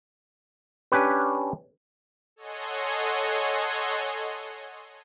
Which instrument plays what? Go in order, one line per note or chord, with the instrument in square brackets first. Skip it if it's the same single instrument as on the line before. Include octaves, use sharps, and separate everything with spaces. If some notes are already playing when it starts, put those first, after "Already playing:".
[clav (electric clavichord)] C#4 D4 G4 B4
[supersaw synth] A4 C#5 D#5 F#5 G#5 C6